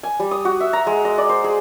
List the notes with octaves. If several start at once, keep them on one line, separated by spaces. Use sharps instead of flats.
G#5
G3
D#6
F#4
E5
A#5
G#3
D#5
D5
C5
G#4